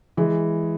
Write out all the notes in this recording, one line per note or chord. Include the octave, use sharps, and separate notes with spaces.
E3 G#3